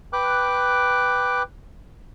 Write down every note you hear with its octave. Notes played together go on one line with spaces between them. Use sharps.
B4 G5 D6 F#6